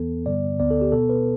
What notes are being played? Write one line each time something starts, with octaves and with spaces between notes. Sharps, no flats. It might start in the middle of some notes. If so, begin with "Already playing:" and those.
Already playing: E2 E3 B3 A4
G2 D3 G3 B3 D5
D2 D3 B3 D5
A4
G4
B2 B3 A4
B4